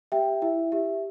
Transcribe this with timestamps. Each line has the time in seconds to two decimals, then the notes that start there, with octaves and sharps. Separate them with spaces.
0.12 G4 E5 G5
0.42 E4 E5
0.72 G4 E5